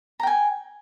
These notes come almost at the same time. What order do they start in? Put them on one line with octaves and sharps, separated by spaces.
A#5 G5 G#5